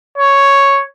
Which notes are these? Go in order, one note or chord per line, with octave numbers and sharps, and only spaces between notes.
C#5